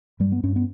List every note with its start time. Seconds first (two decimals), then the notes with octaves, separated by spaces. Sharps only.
0.20 G2 G3
0.32 B3
0.44 G2 C#4
0.56 B3